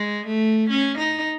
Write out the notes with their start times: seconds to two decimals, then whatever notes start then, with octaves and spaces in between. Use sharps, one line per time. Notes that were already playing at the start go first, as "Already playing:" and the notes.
Already playing: G#3
0.27 A3
0.69 C#4
0.98 D#4